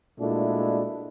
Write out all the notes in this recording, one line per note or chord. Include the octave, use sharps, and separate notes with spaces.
A#2 G#3 A3 D4 E4 F#4